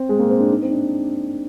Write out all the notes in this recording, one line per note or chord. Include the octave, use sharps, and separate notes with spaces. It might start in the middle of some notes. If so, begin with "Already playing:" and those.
Already playing: C4
G#3
A#3
C4
D4
D#4
C4
D4